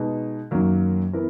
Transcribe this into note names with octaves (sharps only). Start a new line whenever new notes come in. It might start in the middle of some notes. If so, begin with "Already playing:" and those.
Already playing: B2 G#3 D#4
F#2 D#3 F#3 A#3
E3 B3 E4 A#4